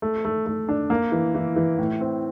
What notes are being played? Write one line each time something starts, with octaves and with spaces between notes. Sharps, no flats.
A3
A3
A3
D4
A#3
E3
E3
E3
A2
C4